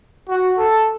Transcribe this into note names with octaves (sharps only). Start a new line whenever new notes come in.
F#4
A4